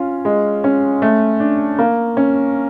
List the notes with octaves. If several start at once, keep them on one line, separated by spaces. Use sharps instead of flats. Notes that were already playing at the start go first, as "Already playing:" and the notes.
Already playing: C#4 F4
G#3
C#4
A3
D4
A#3
C#4